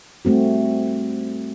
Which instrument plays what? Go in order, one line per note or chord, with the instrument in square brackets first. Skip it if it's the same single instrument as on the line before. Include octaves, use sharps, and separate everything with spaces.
[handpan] G3 A3 C4 F#4